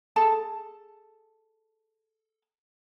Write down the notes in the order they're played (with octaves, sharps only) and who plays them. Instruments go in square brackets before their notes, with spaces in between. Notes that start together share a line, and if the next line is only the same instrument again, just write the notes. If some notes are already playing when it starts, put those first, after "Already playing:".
[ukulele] G#4 A4 A5